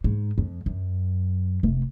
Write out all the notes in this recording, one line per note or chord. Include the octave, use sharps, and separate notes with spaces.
G#2
F2
F#2
F1